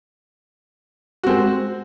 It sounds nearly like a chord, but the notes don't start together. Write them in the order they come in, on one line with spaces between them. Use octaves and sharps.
F#4 C4 G#3